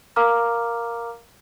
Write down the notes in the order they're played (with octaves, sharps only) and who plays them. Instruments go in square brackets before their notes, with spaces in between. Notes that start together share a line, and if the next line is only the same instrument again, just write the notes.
[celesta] A#4 F5 A#5 D6 F6